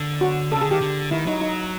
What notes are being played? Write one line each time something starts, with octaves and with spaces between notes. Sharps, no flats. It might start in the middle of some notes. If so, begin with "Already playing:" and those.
Already playing: D3
F#4
C#3 A4
D3 G#4
D#3 G4
D3
D#3 E4
F#3 D#4
D#4